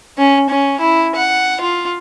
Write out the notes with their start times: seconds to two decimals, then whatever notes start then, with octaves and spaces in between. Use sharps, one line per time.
0.18 C#4
0.50 C#4
0.80 E4
1.16 F#5
1.61 F4